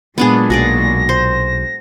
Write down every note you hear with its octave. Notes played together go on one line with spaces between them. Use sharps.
A#2 F#3 G#3 B3 D4 G#4
B1 F#4 G#4 D5 A#6
C5